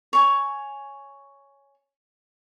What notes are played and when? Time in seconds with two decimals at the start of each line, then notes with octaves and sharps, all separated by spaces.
0.13 C#5 G#5